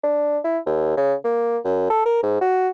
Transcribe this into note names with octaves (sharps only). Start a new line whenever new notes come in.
D4
E4
D#2
C#3
A#3
F#2
A4
A#4
G#2
F#4